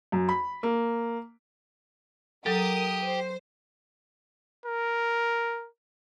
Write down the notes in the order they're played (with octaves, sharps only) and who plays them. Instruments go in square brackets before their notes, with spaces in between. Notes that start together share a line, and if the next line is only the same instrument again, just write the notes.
[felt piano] F#2
B5
A#3
[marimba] F#3 A4 [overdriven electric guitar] G4 [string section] A#4 D#6
[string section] C5
[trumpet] A#4